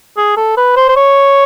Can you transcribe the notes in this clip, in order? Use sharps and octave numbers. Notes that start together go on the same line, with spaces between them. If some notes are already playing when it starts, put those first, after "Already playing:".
G#4
A4
B4
C5
C5
C#5